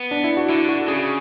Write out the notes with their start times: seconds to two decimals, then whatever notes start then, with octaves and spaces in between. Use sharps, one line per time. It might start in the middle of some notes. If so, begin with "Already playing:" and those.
Already playing: B3
0.11 D4
0.24 E4
0.37 F#4
0.49 D3 E4
0.69 F#4
0.88 C#3 G#4